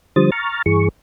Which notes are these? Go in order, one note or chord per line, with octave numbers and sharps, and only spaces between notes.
D3 F3 G3 C5 D#6 A6
A#5 C#6 F6 A6
G2 E3 G#4 C#6